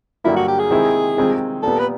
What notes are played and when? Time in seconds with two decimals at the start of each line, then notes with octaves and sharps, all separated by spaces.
0.24 G2 D3 F#3 A#3 E4
0.36 F#4
0.48 G4
0.59 G#4
0.70 C3 D#3 G#3 C4 E4
1.17 C3 D#3 G#3 C4 F4
1.63 A#2 G3 B3 A4
1.79 B4